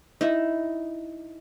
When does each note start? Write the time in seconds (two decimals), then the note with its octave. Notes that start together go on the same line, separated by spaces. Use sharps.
0.21 D#4 E4